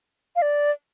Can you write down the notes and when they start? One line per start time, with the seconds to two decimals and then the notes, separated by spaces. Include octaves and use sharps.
0.36 F5
0.42 D5